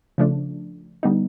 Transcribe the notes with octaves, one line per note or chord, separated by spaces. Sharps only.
C#3 F3 A3 D4
D3 G3 B3 D#4